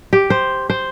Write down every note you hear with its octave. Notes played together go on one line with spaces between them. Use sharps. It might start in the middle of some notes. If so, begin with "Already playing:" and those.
G4
C5
C5